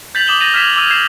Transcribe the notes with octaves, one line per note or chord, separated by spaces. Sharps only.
G6 A6 B6 F7 F#7
D6 D#6 E7 F#7 G7
G6 A6 A#6 D#7 F7 F#7
F6 G#6 B6 E7 F7
D6 E6 D#7 E7
G#6 C7 E7 F#7